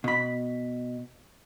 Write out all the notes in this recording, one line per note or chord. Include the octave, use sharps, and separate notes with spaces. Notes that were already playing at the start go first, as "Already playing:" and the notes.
B2 B5